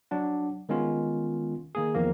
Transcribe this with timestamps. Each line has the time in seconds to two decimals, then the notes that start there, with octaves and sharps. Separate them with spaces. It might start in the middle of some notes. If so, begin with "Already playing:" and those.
0.11 F#3 D4 F#5
0.69 D#3 G#3 B3 C#4 F4
1.75 D#3 A#3 G#4
1.94 E2 D#3 F3 A#3